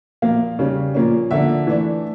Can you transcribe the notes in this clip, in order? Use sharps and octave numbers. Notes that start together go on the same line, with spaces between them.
A#2 F3 A#3 F5
C#3 G3 C#4
A#2 F3 A#3 C#4
D3 F3 A#3 D4 E5
E3 A3 D4